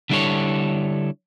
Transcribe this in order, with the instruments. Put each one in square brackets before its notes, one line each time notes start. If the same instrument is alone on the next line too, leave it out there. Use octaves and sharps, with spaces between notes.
[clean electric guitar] D3 G3 D4 E4 A4 C#5